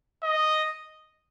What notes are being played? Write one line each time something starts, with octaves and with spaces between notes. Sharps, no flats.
D#5